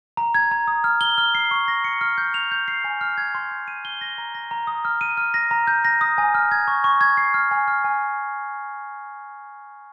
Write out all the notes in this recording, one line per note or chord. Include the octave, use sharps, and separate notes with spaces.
A#5
G#6
A#5
D#6
F6
G7
F6
C7
C#6
A#6
C#7
F6
G6
F7
G6
C7
G#5
F6
G#6
C6
G6
D#7
G7
A#6
A#5
A#6
A#5
D#6
F6
D#7
F6
A#6
A#5
G6
A#6
D#6
G#5
F6
G#6
C#6
C#6
G#6
C7
F6
G#5
F6
G#5